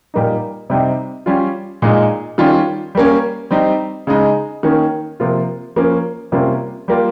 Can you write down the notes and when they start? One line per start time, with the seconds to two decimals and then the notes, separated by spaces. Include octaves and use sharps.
0.14 A#2 G3 A#3 D#4
0.70 C3 G3 C4 D#4
1.26 G3 C#4 F4
1.82 A#2 G#3 D#4
2.38 D#3 G3 C#4 F4
2.95 G3 A#3 C#4
3.51 G3 C4 D#4
4.07 C#3 G#3 D#4
4.63 D#3 A#3 C#4
5.20 C3 F3 A#3 F4
5.76 F3 A#3 C#4 F4
6.32 C3 G3 A#3 C#4 F4
6.88 G3 A#3 F4